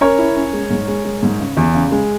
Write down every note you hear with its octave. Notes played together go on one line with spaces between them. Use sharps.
C#4 A#4 C#5
E4
C#4
G#3
G#2
G#3
G#3
G#2
C#3
E2
C#3
G#3